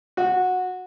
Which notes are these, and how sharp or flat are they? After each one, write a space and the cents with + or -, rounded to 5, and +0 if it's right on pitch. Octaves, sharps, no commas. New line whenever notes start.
F#4 -15